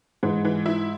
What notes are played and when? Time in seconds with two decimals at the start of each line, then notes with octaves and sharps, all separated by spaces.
0.23 G#2 E3
0.45 E3
0.66 E4